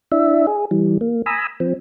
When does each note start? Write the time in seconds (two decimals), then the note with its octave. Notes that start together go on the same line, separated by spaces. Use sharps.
0.12 D4 E4 E5
0.47 G#4
0.71 E3 G3
1.01 A#3
1.26 G#5 A#5 B5 D#6 E6
1.60 F3 C4